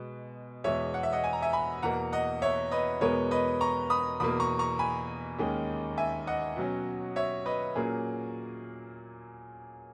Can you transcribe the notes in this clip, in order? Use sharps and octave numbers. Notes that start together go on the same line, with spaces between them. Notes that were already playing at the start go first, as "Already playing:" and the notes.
Already playing: B2 G#3 B3
E2 B2 G#3 C#5 E5
F#5
E5
D#5 F#5
G#5
A#5
E5 G#5
G#5 B5
E2 B2 A#3 F#5 A#5
D#5 F#5
C#5 E5
B4 D#5
E2 B2 G#3 B3 A#4 C#5
B4 D#5
A#5 C#6
B5 D#6
E2 B2 A#3 B5 D#6
A#5 C#6
A#5 C#6
G#5 B5
D#2 D#3 G#3 C#4
E5 G#5
D#5 F#5
B2 F#3 C#4
C#5 E5
B4 D#5
A#2 F#3 A#3 C#4 G#4